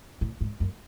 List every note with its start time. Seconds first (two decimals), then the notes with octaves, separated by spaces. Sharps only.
0.21 A2
0.41 G#2
0.60 F#2